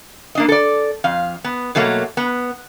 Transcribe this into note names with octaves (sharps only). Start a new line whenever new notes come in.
A#3 D4 D#5
A4 D5
F2 F5
B3
B2 F#3 A3 A#3
B3